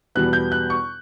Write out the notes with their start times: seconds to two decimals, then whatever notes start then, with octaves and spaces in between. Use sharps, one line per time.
0.15 E2 B2 G3 B3 F#6
0.33 G6
0.52 F#6
0.70 C#6